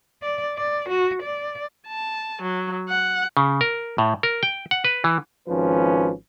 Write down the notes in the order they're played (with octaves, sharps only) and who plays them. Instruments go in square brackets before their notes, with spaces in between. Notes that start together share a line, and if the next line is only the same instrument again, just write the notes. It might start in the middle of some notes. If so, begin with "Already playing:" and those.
[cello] D5
D5
F#4
D5
[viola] A5
F#3
F#5
[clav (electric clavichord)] C#3
A#4
A2
A#4
G5
F#5
B4
E3
[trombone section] G#1 F3 C#4 B4